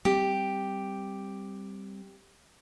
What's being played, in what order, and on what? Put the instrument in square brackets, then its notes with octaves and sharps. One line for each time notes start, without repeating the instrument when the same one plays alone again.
[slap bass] G3 C4 [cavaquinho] G4